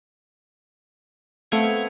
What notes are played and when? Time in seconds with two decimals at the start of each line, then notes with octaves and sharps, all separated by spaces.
1.52 A3 B3 C4 F5 G#6